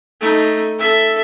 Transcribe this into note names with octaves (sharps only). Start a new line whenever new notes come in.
A3 D#4
A4 E5